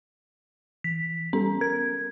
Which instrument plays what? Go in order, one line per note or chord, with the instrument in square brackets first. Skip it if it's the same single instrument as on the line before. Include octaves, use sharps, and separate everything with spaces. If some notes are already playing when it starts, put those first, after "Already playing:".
[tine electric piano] E3 [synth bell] B6
[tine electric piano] G3 B3 A4 [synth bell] C#4
[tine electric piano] A#4 [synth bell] G#6